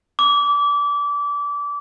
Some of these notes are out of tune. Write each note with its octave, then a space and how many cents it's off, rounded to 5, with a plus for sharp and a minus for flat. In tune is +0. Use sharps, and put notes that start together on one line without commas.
D6 -25